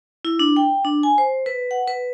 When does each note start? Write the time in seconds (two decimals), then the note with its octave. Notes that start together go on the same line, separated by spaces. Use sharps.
0.25 E4
0.39 D4
0.56 G5
0.85 D4
1.03 G#5
1.18 C5
1.46 B4
1.71 F#5
1.87 B4